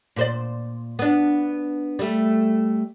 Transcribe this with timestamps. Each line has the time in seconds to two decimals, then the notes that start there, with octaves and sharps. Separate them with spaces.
0.16 A#2 C5 D5
0.99 B3 D4
1.99 G3 A3